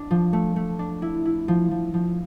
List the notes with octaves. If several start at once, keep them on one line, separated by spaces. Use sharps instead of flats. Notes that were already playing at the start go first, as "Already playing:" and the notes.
Already playing: D4
F3
A3
A3
D4
E4
E4
F3
F3
F3